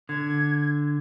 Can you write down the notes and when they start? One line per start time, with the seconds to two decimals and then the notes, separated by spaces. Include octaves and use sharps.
0.09 D3 G#6